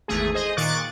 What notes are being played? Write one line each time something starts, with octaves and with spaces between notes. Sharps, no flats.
G#1 E2 A3 G#4
G#4 C5 D#5
A#2 D#3 C#6 D6 F#6 A6